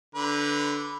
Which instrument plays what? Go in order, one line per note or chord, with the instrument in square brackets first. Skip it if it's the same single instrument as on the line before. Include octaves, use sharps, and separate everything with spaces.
[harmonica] D3 B4